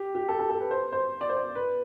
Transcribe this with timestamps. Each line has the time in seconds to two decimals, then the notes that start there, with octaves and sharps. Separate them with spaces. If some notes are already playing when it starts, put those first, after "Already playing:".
Already playing: G4
0.15 G4
0.29 A4
0.39 A4
0.50 A4
0.60 B4
0.71 C5
0.92 C5
1.21 D5
1.29 C5
1.37 D5
1.55 B4